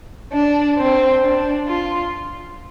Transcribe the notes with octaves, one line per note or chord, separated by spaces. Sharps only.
D4
C4
D4
F4